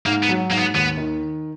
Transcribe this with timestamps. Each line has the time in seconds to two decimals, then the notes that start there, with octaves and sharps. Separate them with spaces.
0.06 G#2 A#3
0.23 B3
0.29 F#3
0.51 G#2 A#3
0.57 B3
0.74 D#2 B3
0.97 D#3